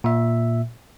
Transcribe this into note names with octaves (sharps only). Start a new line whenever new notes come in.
A#2 E5